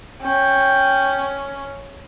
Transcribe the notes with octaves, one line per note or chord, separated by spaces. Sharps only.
C#4 G5